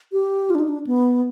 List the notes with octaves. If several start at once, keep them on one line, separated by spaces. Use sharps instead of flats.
G4
F4
D4
D#4
D4
B3